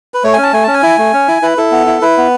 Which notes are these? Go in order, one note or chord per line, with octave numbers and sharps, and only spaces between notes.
B4
A3 C#5
C#4 G#5
A5
A3 G#5
C#4 A5
G#5
E4
A3
C#4
E4
E4 B4
E4 A4
B3
E4
E4 B4
B3